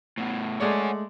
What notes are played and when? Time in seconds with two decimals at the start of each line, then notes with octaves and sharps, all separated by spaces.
0.18 A2 B3
0.60 G#3 A3 C#5 D5 F#5 G#5